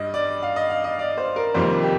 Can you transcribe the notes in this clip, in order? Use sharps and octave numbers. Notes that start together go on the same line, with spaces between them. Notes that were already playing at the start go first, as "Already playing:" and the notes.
Already playing: G2 G3 D#5
D5
F5
D#5
F5
D#5
D5
C5
A#4
F2 C3 D#3 G3 A#3 C5
G4